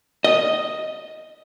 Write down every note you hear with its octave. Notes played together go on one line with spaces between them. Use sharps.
D#5